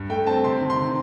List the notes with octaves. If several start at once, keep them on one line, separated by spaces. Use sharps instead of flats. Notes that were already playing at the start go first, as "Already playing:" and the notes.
Already playing: G2
A3 G5
C4 A5
C3 C6
D#3
C6
D#3